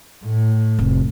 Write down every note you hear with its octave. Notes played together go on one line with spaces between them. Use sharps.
A2
F1